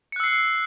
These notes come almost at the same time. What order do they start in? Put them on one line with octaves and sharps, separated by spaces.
C#7 F#6 E6 C7